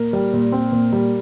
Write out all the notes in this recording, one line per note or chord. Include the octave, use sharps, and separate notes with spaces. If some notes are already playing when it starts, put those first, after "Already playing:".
Already playing: A#2 A#3 A#4
G3
A#2
C4
A#2
G3